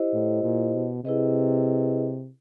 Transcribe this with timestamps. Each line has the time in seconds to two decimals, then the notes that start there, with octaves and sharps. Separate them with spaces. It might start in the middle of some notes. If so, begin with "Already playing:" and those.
Already playing: E4 G4 C5 D#5
0.13 A2
0.43 A#2
0.75 B2
1.04 C3 E4 G#4 B4 D#5